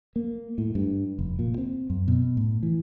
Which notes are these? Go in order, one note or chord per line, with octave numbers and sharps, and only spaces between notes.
A#3
A2
G2
F1
A#2
C4
F#2
B2
A2
E3